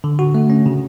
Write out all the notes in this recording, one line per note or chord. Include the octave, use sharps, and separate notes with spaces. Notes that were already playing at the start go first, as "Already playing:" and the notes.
D3
F#4
A3
C#4
C#3